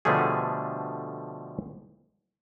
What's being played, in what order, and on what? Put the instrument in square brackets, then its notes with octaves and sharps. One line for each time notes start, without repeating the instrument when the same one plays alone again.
[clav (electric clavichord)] B2 D3 F3 G3 A3 G#4